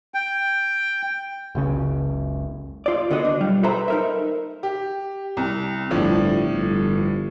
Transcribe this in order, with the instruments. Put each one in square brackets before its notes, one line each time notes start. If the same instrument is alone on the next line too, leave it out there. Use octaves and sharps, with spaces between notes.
[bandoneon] G5
[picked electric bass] F#1 C#2 C#3
[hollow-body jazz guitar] F4 D5
D2 D3 B3 F#4 D#5
D4
B1 G3 F4
A4 B4 C5 E5 A#5
D#4 A#4 E5
[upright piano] G4
C2
[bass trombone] G1 [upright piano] A2 F3 D4
[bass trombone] G1